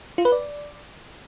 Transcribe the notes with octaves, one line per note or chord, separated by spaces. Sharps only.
F4
B4
D5